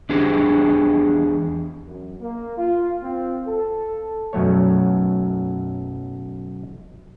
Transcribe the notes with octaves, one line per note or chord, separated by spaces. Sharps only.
E2 D4 G4 G#4
F#2
A#3
F4
C4
A4
B1 F#2 F#3 A3 C#5